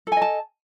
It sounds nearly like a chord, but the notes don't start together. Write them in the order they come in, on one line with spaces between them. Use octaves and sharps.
A4 G#5 D#5 A5